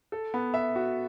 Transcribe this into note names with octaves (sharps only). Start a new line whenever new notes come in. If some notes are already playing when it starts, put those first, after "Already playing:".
A4
B3
E5
F#4